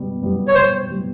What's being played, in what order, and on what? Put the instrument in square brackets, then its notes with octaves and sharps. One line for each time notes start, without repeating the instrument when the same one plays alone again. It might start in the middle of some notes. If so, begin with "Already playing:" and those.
Already playing: [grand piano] B2 G3 B3
G3 B3
[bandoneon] C#5
[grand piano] B2 [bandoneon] C5
[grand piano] G3 B3